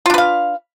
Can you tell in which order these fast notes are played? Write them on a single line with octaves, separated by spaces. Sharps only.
F4 D4 B4 F5